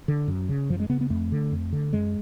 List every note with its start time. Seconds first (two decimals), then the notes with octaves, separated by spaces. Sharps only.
0.08 D3
0.28 F#2
0.49 C#3
0.70 F#2 F3
0.80 G#3
0.89 C#3 B3
1.01 B3
1.10 F2 A3
1.32 D3
1.52 F2
1.73 D3
1.93 F#2 G#3